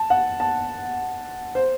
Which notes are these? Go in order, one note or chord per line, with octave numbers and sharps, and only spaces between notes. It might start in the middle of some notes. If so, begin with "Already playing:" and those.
Already playing: A5
F#5
A5
C5